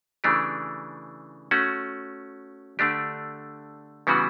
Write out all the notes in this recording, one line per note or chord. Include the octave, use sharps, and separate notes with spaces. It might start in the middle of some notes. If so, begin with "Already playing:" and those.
C#3 E3 A3 D4 G4
A3 C#4 F#4
D3 A3 D4 G4
C#3 E3 G3 B3 F#4